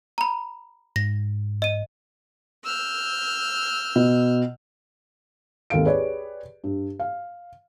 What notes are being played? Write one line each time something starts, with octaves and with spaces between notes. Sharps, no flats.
A#5 B5
G#2 A#6
D#5 D#7
E6 F6 G6
B2
G#1 D#2 A4 F5 D7
G4 G#4 B4 C#5 D5
G2
F5